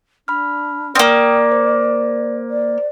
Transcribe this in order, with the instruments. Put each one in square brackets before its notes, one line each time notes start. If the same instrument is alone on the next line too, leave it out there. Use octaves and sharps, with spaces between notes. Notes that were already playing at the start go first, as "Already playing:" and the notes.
[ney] D4 [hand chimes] B5 F6
[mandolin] A#3 C4 [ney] D5 [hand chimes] G5 D#6 F6
[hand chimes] C5
[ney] D5